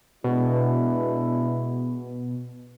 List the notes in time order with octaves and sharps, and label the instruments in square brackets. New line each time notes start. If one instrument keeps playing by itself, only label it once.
[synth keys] B2 [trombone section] G#3 D4 E4